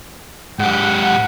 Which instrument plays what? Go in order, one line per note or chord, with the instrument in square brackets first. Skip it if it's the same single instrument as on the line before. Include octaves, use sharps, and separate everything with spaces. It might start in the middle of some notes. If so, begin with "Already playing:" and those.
[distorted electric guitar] G#2 G4 [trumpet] F#5